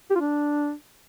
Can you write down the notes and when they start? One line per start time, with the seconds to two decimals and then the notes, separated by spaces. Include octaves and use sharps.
0.10 G4
0.15 F4
0.20 D4